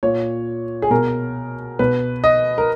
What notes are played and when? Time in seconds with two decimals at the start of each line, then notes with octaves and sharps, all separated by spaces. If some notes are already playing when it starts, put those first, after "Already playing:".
0.03 A#2 C#5
0.82 G#4
0.90 B2 A#4
1.79 B2 B4
2.24 D#5
2.58 A#4